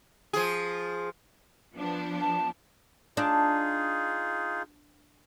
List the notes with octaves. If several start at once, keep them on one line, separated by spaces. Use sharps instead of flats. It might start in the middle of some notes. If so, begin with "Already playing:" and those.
F3 G#4
F3 B3 D4
A5
D4 D#4 F4 G#4